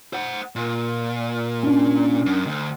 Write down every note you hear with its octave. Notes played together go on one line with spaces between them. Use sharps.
C5 F#5
A#2
C#4 D4
F#2
D2